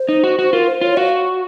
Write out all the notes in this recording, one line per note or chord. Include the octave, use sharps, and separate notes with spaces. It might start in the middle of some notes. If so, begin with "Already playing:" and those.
Already playing: C5
D#4
F#4
F#4 C5
F4 A#4
C5
F4 C#5
F#4 F5